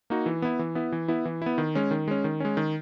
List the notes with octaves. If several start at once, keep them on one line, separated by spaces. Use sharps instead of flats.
A#3 D#4 F#4
E3
B3 E4
E3
B3 E4
E3
B3 E4
E3
B3 E4
D#3
G#3 C#4
D#3
G#3 C#4
D#3
G#3 C#4
D#3